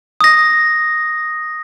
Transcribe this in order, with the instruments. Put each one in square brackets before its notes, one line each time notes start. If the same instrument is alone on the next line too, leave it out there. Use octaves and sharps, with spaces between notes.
[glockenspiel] D#6 A#6